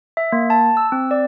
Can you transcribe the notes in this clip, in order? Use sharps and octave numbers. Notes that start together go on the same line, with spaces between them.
E5
A#3
A5
E6
C4
D5